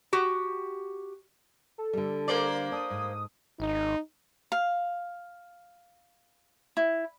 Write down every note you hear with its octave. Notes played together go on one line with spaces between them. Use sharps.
F#4 G4
A4
D3 G3
A#3 C5 D5
D4 D#6
G#2
G#1 D#4
F5
E4